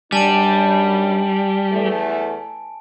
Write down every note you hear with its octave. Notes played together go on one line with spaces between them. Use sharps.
F#2 G3 D4 G#5 A5 D7
E2 A3